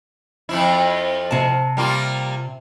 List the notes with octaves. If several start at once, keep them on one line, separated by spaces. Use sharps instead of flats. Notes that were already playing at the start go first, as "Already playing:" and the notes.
F2 F3 E4
C3 A5
G3 A#3 F4